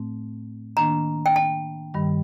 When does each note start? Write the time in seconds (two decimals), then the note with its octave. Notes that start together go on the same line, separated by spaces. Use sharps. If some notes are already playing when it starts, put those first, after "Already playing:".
Already playing: A2 A3 C4
0.77 D#3 A#3 D4 A#5
1.26 G5
1.36 A5
1.94 G2 D#3 G3